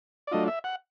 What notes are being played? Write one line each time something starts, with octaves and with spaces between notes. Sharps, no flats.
D5
F#3 A3 D4 F4 D#5
E5
F#5